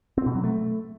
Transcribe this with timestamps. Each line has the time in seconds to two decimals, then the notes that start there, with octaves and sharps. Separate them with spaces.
0.18 C4
0.26 B2
0.35 F#3
0.44 A3